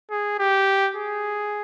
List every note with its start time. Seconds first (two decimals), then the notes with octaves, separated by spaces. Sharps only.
0.11 G#4
0.39 G4
0.96 G#4